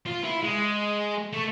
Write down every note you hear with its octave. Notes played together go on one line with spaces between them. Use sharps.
F4
E4
G#3
A3